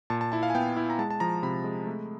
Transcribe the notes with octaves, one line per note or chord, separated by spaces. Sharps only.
A#2 A5
A5
E4 A5
F5
G#5
B3 G5
E4
A#5
G#3 A5
A5
F3 A#5
C3 B5
G#3
A3